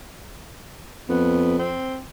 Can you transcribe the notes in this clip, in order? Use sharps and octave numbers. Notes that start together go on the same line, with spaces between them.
F2 B3
C4